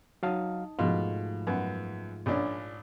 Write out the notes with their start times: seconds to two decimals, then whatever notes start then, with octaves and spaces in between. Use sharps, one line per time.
0.23 F#3 D#4 D#5 F5 A5
0.79 G#2 B2 F3 A3 F4
1.47 F#2 B3
2.26 A#1 C#4 D4